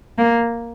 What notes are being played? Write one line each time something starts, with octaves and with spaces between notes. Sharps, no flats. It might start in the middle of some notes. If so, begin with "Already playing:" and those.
A#3